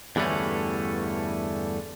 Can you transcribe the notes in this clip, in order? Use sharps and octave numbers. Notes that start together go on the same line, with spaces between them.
E2 G2 D3 E3 A3 C#4